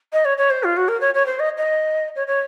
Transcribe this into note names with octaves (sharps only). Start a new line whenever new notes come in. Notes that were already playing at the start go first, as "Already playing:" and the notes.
D#5
C#5
C#5
C5
F4
F#4
A#4
C#5
C#5
C5
D#5
D#5
C#5
C#5